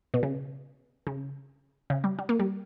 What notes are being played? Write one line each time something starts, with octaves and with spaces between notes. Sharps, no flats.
B2
C#3
C#3
C#3
G3
G3
A#3
G3